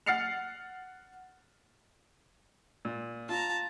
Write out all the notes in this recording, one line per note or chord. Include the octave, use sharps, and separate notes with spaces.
F#5 F6 A6 C7 C#7 F7
A#2
F4 A5 A#5